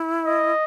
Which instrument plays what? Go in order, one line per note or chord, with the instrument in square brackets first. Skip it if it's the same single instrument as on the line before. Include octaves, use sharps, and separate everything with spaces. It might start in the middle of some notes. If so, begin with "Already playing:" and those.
Already playing: [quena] E4
[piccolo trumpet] D#5